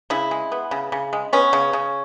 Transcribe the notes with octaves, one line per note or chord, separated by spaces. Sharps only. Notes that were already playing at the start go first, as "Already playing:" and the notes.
C#3 E4
G#3
B3
C#3
C#3
G#3
B3 C#4
C#3
C#3